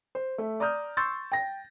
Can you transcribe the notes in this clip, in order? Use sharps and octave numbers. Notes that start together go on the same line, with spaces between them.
C5
A3 E5
D5 A#5 D#6 F6 G6
C6 C#6 E6 G6 A6
G5 A#6